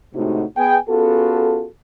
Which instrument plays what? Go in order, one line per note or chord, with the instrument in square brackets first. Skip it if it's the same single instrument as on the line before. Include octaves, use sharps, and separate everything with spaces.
[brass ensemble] A2 C3 G#3 A3 D#4 F#4
B3 G#4 G5 G#5
B3 C#4 F4 F#4 G#4 A4